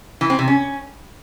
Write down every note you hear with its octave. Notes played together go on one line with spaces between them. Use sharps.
E3
C4
C3
C#4